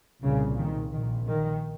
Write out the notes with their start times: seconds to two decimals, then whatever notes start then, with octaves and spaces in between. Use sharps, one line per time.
0.22 C2 A#2 C#3
0.58 D#3
0.92 A#1 A#2 D#3
1.28 D#3